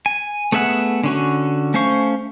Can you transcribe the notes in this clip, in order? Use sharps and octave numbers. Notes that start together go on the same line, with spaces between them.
G#5
A3 B3 G#4 E5 F#5
D3 C#4 F#4
A3 C#4 C5 F5 C#6